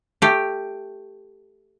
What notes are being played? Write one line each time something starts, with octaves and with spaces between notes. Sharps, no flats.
A3 G4